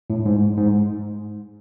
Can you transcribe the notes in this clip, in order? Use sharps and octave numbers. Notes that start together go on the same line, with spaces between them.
A2
G#2
G#2